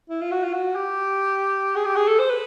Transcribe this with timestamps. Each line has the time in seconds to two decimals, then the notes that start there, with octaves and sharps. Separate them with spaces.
0.10 E4
0.21 F4
0.31 F#4
0.43 F4
0.53 F#4
0.75 G4
1.76 G#4
1.85 G4
1.96 G#4
2.08 A4
2.19 C5
2.29 B4